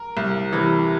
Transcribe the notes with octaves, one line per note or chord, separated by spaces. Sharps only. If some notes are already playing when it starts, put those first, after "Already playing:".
Already playing: A#4
C2
C3 E3